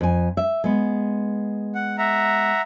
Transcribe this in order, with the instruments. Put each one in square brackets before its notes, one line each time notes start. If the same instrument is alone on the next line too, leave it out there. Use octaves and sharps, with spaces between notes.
[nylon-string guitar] F2 G#5
E5
G#3 B3
[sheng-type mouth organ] F#5
E5 F#5 A#5